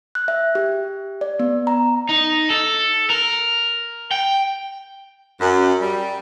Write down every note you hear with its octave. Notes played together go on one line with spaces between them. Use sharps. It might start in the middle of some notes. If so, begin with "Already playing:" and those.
F#6
E5
G4
D5
B3
A#5
D#4
A4
A#4
G5
F#2
G3